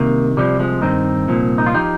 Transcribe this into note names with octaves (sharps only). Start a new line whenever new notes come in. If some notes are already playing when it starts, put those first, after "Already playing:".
Already playing: C2 C3 D#3 A#3
C2 C3 F3 G3
F3 G#3
G2 D#3 C4 D#4
C2 A#2 F3
D#4
F4
F3 D#4 G4